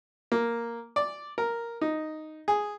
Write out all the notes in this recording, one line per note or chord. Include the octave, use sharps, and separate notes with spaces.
A#3
D5
A#4
D#4
G#4